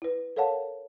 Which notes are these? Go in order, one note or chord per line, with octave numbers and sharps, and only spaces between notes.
E4 B4
A4 A#4 C#5 F5 F#5 A5